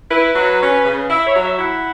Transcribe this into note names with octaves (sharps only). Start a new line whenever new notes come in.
E4 B4
F#3
C#4
C#3
E4 E5
C#5
F#3
E5
E4 F#5